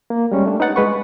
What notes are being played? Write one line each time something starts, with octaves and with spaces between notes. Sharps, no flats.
A#3
G3 G#3 C#4
A3 D4
D#4 B4 F#5 A6
G#3 B4 C#6